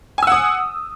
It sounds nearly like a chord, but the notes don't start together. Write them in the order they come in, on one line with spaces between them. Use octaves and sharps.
G#5 E6 F#5 D#6